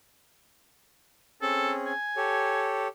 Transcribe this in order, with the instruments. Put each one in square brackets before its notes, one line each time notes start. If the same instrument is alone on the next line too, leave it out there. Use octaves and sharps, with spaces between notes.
[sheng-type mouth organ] C4 C#4 G#4 [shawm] A4
[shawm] G#5
[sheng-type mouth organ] G4 A4 C#5